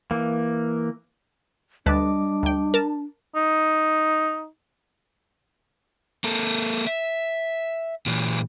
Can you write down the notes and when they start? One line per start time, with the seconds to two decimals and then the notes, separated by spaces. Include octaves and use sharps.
0.11 E3 A#3
1.86 D2 G3 D4 B4 D#5 A5 D6
2.43 D2 G5
2.74 A#4 A5
3.36 D#4
6.24 A#3 A4
6.87 E5
8.06 A#2 E3